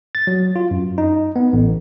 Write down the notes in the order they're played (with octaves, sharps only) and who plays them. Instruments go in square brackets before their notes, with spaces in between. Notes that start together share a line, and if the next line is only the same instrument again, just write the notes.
[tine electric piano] A6
F#3
F4
F#2
D#4
B3
A1